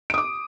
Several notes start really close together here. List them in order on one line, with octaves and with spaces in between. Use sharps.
D7 D#6 D6